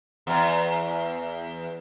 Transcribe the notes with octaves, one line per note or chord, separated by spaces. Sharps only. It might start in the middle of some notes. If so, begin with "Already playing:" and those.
E2